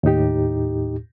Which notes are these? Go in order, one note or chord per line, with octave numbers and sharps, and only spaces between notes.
D#2 A2 D#4 G4